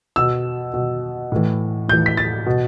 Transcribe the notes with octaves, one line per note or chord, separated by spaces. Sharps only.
B2 E6
B2
A2 E3
A2 E3 G6
B6
A6
B2